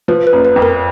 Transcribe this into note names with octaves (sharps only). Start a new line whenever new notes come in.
F3 B4
B4
F#1
B4
F2
A#4